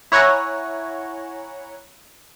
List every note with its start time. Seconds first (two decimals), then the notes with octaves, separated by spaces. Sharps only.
0.12 E4 C#5 F#5 G#5 A#5